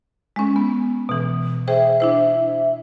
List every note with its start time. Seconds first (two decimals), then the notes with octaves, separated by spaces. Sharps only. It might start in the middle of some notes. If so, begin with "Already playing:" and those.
0.36 G#3 C#4
0.56 B3
1.09 B2 E3
1.68 G#4 C5 E5 G5
2.00 D4 E4 C5